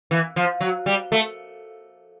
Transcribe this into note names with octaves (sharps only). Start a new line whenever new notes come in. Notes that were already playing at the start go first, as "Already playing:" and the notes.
E3
F3
F#3
G3
A3